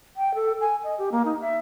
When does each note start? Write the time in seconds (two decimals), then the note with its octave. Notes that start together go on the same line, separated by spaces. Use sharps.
0.16 G5
0.35 A4
0.61 G#5
0.84 D#5
0.98 G4
1.12 A#3
1.25 D#4
1.41 E5